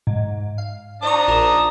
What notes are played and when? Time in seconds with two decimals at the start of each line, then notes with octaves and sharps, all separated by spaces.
0.07 G#2
0.58 F5
1.02 D4 C5 D5 A#5 C#6 D#6
1.28 A#1 A#4 E7